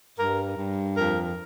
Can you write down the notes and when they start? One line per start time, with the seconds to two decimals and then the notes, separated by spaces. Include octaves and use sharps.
0.18 G2 A#4
0.57 G2
0.97 F2 A#4